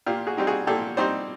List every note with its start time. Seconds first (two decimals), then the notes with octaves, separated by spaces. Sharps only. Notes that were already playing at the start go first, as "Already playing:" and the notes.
0.06 A#2 F4 G4
0.27 F#4 G#4
0.37 G3 C4 D#4
0.47 F#4 G#4
0.67 A#2 G4 A4
0.97 G3 C4 D#4 C5 D5